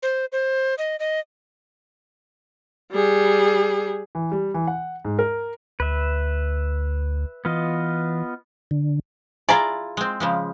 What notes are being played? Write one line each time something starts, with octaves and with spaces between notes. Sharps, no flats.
C5
C5
D#5
D#5
G3 G#4
E3
G3
E3
F#5
G#2
A#4
D2 B4 E5
E3 B3 F4 D#5
D3
E4 F4 G#4 D5 A#5
G#3 C4
C#3 F3 G#3